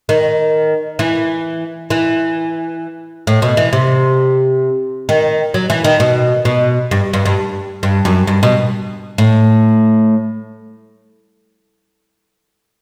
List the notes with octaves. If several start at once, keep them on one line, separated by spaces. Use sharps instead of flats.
D#3
E3
E3
A2
B2
E3
C3
D#3
F#3
E3
D#3
B2
B2
G2
G2
G2
G2
F#2
G2
B2
A2